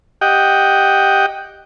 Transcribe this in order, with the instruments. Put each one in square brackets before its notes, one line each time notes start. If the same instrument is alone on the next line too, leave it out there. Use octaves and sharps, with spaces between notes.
[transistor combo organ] G4 D#5 F#5 G5